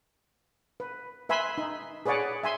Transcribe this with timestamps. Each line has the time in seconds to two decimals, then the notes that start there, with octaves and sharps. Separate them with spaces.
0.80 B4
1.29 B4 E5 G#5 B5 C6
1.58 D#4
2.06 G#4 B4 C#5 D5 F#5 G#5
2.43 E5 G#5 C6